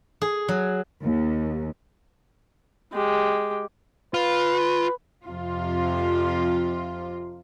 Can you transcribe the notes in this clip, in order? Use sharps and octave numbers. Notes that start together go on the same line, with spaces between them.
G#4
F#3
D#2
G#3 G4
F4 B4
F2 C3 F4